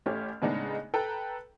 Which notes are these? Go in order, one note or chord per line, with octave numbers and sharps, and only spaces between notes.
A1 A3 C#4 G4 F6
A2 C#3 G#3 B3 D4 D#4
A4 B4 G5 A#5